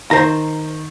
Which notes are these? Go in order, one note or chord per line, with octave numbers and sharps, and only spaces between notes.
D#3 C5 A#5